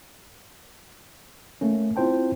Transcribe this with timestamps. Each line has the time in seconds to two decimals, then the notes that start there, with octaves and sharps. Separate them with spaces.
1.61 A3 A#3 C#4
1.96 C4 E4 F4 C5 G5 A5